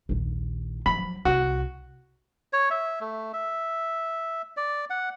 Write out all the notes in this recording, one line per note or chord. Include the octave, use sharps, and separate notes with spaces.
A#1 D#2
F3 F#3 B5
C2 F#4
C#5
E5
A3
E5
D5
F#5